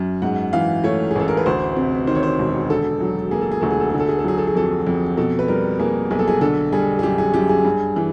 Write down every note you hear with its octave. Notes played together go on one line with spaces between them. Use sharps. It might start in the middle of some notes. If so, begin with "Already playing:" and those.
Already playing: F#2
G#2 F#5
E3 F5
A3 C#5
G#4
A1 A4
A#4
B4
D2 C5
C3
D#3 C5
C#5
C5
E1
D3 A4
F#3
A#3 G#4
A4
G#4
D2 A4
G#4
A4
D3 G#4
A4
G#4
A4
F#3 G#4
A4
G#4
F2 A4
G#4
F2
B2 A4
B4
G3 A#4
A#3 G#4
B1 G#4
A4
G#4
D3 A4
G3 G#4
G#4
F#2 G4
G#4
F#2 G4
G#4
G2
E3